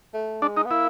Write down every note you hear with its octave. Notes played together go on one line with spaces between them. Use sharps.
A3
G#3 D4
D#4
B3
A#3 E4